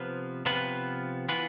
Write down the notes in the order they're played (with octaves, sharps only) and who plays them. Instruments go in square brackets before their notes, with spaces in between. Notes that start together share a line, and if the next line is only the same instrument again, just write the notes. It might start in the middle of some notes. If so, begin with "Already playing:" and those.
Already playing: [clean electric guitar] C3 F3 B3 F4 B4
C3 F3 B3 F4 B4
E3 B3 F4 B4